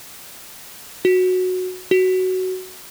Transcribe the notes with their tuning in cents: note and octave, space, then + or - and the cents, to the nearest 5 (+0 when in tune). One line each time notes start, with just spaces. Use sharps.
F#4 -10
F#4 +10